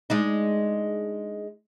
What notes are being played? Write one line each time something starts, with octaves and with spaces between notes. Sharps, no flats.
G#3 D4 D#4